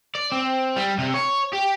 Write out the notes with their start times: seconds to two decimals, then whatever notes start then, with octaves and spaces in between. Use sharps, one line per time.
0.15 D5
0.32 C4
0.76 G3
0.98 C3
1.14 C#5
1.53 G4